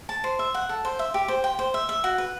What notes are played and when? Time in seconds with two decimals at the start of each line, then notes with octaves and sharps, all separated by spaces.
0.09 A5
0.24 C5
0.39 E5
0.54 F#5
0.69 A4
0.85 C5
0.99 E5
1.14 G4
1.28 C5
1.44 G5
1.59 C5
1.74 E5
1.89 E5
2.04 F#4
2.18 B4